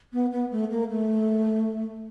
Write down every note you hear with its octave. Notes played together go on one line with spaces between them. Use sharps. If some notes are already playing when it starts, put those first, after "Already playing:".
B3
B3
A3
A#3
A3